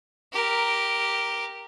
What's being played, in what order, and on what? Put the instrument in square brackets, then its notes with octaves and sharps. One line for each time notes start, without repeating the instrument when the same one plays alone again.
[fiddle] G4 A#4